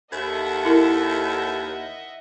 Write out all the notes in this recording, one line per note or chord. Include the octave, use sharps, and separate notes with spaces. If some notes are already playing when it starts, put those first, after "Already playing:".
D#2 A4 D#5 E5 F#5
E4 A#4